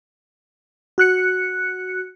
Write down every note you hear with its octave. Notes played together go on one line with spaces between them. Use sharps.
F#4 F#6 C#7